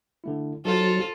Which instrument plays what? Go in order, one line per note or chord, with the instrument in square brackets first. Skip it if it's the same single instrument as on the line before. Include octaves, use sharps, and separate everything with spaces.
[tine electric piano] D3 A3 E4
[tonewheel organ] F#3 [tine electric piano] D#4 C5 [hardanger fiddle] F4 A4